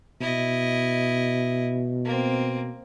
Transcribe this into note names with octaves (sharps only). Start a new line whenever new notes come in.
B2 E4 D#5
A#3 C4